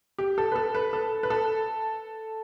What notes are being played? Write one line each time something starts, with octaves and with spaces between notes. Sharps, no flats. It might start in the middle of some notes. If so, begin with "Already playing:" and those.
G4
A4
B4
A4
B4
A4
B4
A4